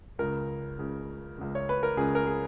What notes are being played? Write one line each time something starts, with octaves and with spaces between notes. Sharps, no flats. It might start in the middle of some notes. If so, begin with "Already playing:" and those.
C#2 C#3 A#4
C#2 C#3
C#2 C#3
C#5
B4
A#4
C#2 C#3 G#4
A#4
G#4